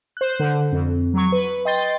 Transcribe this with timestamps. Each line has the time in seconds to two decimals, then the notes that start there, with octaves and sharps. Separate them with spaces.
0.17 C5 F#6
0.39 D3
0.72 F2
1.14 F#3 C#6
1.32 B4
1.65 D#5 G5 C6 A6